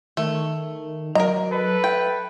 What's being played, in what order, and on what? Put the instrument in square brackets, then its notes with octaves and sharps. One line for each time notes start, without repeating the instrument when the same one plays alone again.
[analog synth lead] D#3 [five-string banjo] A3
[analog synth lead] F#3 [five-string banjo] A#4 A#5 [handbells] D#5
[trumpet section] A4 B4
[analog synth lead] E5 [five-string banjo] G5